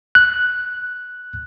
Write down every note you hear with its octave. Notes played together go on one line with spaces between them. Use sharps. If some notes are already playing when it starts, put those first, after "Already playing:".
F#6